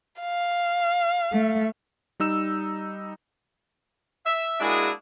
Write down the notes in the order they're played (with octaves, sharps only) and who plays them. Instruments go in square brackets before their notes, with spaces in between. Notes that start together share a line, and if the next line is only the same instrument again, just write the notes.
[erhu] F5
[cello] A3
[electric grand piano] G3 D#4 E6 E7
[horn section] E5
G#3 A#3 D4 E4 F#4 G#4